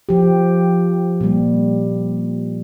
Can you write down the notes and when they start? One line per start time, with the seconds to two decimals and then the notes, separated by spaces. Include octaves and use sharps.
0.09 F3 G4
1.21 A#2 G3